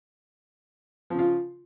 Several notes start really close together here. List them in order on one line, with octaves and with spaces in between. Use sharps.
F3 C#3 F4